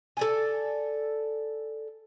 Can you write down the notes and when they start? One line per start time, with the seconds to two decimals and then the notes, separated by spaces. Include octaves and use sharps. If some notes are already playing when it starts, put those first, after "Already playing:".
0.17 A4 D5 G#5